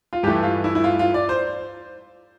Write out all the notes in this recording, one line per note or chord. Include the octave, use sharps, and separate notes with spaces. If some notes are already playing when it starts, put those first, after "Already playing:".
F4
G2 E3 A3 G4
F4
E4
E4
F4
F4
D5
C5